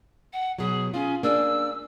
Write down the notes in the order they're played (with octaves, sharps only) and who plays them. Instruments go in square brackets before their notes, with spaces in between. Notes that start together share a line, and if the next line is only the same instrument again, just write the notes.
[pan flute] F#5
[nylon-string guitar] B2 F#3 [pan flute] G#4
[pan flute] C#4 [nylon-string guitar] F4
[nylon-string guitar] A#3 D4 G#4 [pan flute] E6